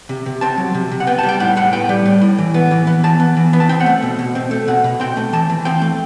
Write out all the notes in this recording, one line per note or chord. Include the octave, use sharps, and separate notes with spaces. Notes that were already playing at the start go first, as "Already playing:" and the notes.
C3
C3
C4 A5
F#3
C3
C3
F#5
B3 G5
A5
G3
G5
A2 F#5
A2 F#5
B3 G5
G3
A2
A2
E3
B3
E3
B3
E3 A5
B3
E3
B3
A5
C4 G5
F#5
A3
B2
B2
C4
A3
B2 F#5
B2
C4 G5
A3
E3 A5
E3
C4 G5
A3